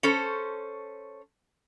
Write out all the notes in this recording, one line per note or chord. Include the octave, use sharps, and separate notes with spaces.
C#4 A4 C5